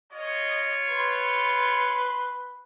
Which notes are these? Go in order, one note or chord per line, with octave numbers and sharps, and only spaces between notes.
F4 C#5 D#5
B4 C6